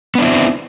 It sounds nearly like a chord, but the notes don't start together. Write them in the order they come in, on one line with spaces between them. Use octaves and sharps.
B3 D4 E4 C4